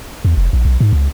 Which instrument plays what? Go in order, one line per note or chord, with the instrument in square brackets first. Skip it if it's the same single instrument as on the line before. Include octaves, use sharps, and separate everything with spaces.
[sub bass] E2
F1
A#1
B1
G#2
C#2